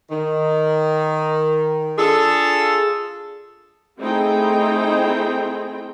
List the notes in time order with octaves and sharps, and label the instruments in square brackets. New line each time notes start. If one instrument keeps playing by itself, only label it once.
[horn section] D#3
D4 F4 G#4 A4
[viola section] A3 C4 D#4 E4 G#4 G5